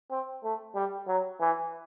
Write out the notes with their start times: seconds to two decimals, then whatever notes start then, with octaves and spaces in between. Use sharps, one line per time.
0.11 C4
0.44 A3
0.75 G3
1.08 F#3
1.40 E3